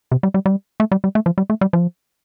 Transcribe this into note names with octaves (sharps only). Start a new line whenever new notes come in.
C3
G3
G3
G3
A3
G3
G3
A3
F3
G3
A3
G3
F3